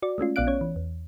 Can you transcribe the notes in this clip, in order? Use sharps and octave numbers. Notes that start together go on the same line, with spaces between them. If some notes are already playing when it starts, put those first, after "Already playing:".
F#4 D5
G#3 A3 C#4 F4
A#1 B3 D5 F5 F#6 D7
C#4 C#5
E3
E2